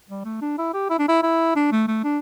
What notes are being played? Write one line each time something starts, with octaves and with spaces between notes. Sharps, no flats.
G3
A3
D4
E4
G4
E4
D4
E4
E4
D4
A3
A3
D4